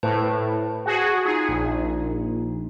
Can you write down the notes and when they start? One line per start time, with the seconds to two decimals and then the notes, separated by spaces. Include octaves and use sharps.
0.03 A2 B4 C5 A5
0.86 F#4 G#4
1.25 D#4 F4 G#4
1.48 A#1